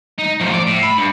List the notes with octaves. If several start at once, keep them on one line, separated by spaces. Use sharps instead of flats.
D#4
A2 F3
D5
A2
B5
G2